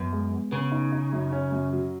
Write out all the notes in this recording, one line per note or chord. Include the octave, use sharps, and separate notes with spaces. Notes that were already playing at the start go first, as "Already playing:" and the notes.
Already playing: F#2 B3
G#3
B3
C#3 B3
D#4
D#4
F#2
C#4
F#2
F#3